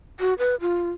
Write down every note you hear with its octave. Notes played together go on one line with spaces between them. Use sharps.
F#4
B4
F4